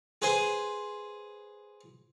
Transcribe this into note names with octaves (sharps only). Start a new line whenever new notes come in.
G#4 B4 C5 G#5